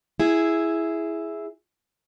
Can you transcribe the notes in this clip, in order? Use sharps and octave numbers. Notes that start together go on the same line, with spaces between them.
E4 G#4